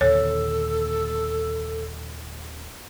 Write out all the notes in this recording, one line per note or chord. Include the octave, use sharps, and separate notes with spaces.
D#2 A#2 D3 A4 C#5